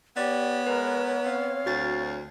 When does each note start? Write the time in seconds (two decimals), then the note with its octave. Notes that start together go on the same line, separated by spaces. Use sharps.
0.17 B3 G4 C#5 D5
0.67 G#3 A#4 B4
1.22 C4 F5
1.66 D2 F#4 A6